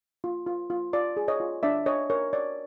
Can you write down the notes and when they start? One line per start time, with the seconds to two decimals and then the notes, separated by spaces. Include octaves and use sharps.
0.24 F4
0.47 F4
0.70 F4
0.93 F4 D5
1.17 G#4
1.28 C#5 D#5
1.40 F4
1.63 D4 D5 E5
1.86 D4 C#5 D#5
2.10 A#4 C#5
2.33 C#5 D5